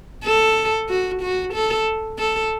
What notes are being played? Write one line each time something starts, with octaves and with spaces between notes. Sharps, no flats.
A4
F#4
F#4
A4
A4